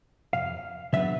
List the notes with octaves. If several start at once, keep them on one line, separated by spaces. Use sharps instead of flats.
F2 C3 F5
C#3 F#3 B3 D4 E5